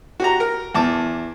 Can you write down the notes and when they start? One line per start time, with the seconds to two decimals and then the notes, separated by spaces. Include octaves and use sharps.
0.20 F#4 G4 A#5
0.40 A#4
0.75 E2 A5 D6